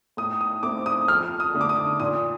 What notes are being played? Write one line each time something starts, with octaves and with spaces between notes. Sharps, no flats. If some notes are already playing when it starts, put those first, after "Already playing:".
A2 D#6
D#6
A3 C4 D6
D#6
F2 F6
D#6
D3 A3 D4
D6
D#6
A#2 D#6